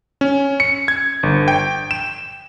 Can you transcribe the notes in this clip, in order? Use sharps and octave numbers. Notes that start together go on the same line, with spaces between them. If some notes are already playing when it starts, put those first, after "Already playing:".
C#4
C#7
G#6
G1
G5
E7